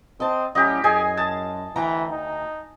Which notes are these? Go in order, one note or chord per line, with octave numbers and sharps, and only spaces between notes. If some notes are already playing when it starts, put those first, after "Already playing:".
C4 D#5 A5
A2 F#3 C#4 G4 D#5
F#2 G#4 D#5 G#5
A5
D2 E3 G5 A#5
D#4